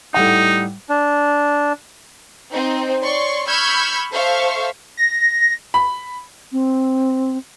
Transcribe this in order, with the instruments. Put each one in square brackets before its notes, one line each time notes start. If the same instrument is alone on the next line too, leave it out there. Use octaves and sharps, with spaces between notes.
[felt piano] A2 G3 F#5 [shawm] D#4
[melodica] D4
[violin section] C4 D#4
C#5 D5 C6 C#6
B5 C#6 E6 F6 G6 G#6
A4 C5 E5 F5 C#6
[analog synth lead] A#6
[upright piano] B5
[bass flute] C4